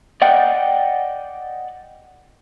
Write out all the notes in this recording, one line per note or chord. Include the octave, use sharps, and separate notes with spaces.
D5 D#5 F#5 G5